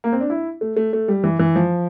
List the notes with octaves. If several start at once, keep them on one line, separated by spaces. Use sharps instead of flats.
A#3
C4
D4
E4
A3
A3
A3
G3
E3
E3
F3